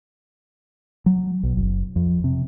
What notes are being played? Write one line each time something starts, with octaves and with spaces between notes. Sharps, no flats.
F#3
B1
F#1
F2
C3